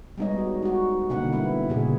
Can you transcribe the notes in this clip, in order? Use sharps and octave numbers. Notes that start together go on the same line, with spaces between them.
G3 G#3 B3 D#4 C#5 D#5
F#4
D#4 F#4
B2 D3 A#3 C4 D#4 F#5
G3 B3 E4
A#2 C#3 G#4